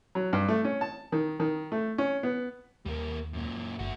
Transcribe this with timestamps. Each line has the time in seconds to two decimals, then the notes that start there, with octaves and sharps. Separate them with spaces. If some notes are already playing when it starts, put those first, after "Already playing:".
0.15 F#3
0.33 G2
0.48 A3
0.64 C#4
0.81 A5
1.12 D#3
1.40 D#3
1.72 A3
1.98 C#4
2.23 B3
2.85 D#2 G3 A#3
3.33 F#2 A#2
3.79 G1 A3 F#4